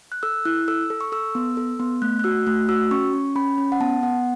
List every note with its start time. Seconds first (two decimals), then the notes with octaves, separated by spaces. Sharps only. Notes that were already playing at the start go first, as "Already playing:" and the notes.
0.12 F#6
0.23 A4 E6
0.45 E4 F#6
0.68 A4 E6
0.90 A4
1.01 C#6
1.12 A4 E6
1.35 B3
1.57 A4
1.80 B3
2.02 A3 F#6
2.19 F#6
2.24 F#4 E6
2.47 A3 F#6
2.69 F#4 E6
2.91 C#4 C#6
3.13 C#4
3.36 C#4 B5
3.58 C#4
3.72 F#5
3.80 B3 A5
4.03 B3 F#5